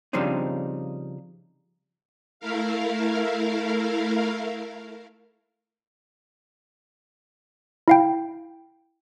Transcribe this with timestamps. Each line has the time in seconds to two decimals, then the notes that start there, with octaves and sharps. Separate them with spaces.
0.13 C#3 F3 G3 C4 D4 D#4
2.40 A3 E4 A#4 F5
7.88 E4 F5 G5